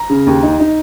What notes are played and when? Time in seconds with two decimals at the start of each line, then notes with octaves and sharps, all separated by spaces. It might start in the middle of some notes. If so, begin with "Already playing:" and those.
Already playing: A#5
0.10 C#3
0.27 D#2
0.43 D#4
0.60 D#4